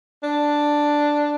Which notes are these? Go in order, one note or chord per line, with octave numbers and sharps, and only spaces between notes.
D4